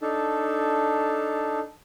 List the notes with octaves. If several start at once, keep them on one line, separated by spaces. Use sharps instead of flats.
D4 D#4 A4